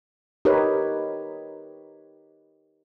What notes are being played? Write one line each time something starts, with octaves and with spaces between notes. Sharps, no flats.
D#4 G4 A#4 B4 C#5